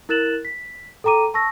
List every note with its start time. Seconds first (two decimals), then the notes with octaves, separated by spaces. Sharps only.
0.09 E4 A#4 F#6 A6 E7 F#7
0.45 B6
1.04 A4 G5 A#5 D6 D#7
1.34 A5 C#6 E6 A#6